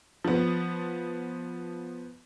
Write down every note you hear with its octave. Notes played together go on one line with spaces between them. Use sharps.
F3 B3